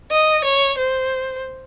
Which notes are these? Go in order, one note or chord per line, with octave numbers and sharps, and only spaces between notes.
D#5
C#5
C5